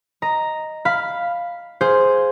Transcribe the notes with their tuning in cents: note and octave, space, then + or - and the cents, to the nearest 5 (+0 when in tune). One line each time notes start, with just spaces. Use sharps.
D#5 +0 A#5 +0
F5 +0 B5 +0
G#4 +0 C5 +0 F5 +0